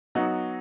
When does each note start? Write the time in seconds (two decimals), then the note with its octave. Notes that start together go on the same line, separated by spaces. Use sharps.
0.15 F#3 B3 D#4 F#4